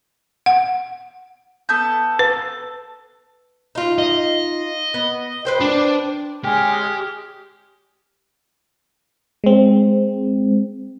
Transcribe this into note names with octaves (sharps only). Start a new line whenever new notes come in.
F#5
B3 A4 G6
B4
D#4 F4
D#5
B3
B4 C5 G5
D4
G#3 G4 G#4 F6
G#3 C4